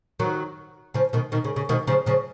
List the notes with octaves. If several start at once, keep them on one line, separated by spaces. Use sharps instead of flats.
D#3 F#3
C#3 F3
B2 D#3
B2 D#3
C#3
C#3
B2 D#3
C#3 F3
C#3 F3